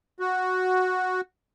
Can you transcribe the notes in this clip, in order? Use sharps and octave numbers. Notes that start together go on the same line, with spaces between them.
F#4